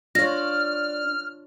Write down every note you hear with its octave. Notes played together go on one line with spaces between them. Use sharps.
D4 F4 C#5 F6 A#6